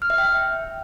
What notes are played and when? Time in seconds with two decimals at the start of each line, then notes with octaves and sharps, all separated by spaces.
0.02 F6
0.10 E5
0.18 G5